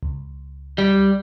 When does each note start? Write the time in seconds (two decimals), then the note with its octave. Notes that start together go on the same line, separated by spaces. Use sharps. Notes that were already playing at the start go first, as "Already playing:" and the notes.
0.03 C#2
0.78 G3